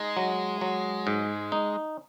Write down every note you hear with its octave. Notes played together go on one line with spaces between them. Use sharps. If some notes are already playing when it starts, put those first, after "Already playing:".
Already playing: G#3 D#4
F#3
F#3
G#2
D#4